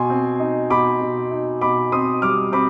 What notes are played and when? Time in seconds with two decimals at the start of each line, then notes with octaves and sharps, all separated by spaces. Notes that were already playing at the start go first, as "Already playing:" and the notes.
Already playing: B2 G#5 C6
0.10 C4
0.40 D#4
0.70 B2 B5 D6
1.01 B2
1.31 D#4
1.61 B2 B5 D6
1.92 C4 C6 D#6
2.22 G3 D6 F6
2.52 C4 B5 D6